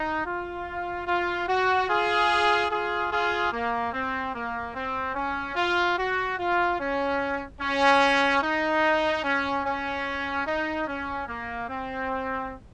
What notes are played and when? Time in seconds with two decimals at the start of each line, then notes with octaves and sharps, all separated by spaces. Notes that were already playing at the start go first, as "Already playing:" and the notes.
Already playing: D#4
0.25 F4
1.07 F4
1.47 F#4
1.88 F4 G#4
2.70 F4 G#4
3.11 F4 G#4
3.51 A#3
3.93 C4
4.34 A#3
4.74 C4
5.15 C#4
5.56 F4
5.97 F#4
6.38 F4
6.79 C#4
7.60 C#4
8.42 D#4
9.23 C#4
9.64 C#4
10.45 D#4
10.87 C#4
11.27 A#3
11.68 C4